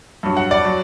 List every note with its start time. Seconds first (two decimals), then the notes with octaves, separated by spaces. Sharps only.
0.23 G2 F#3
0.37 F#5
0.51 D5
0.65 F#3